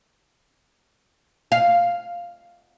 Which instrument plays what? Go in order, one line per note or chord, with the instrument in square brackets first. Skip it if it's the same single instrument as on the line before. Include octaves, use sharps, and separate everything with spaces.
[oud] F5